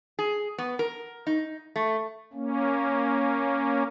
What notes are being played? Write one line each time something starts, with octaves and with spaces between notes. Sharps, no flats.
G#4
B3
A#4
D#4
A3
A#3 C#4